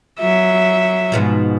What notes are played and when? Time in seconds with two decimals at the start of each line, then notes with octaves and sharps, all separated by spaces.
0.19 F#3 E5
1.12 G#2 B2 F3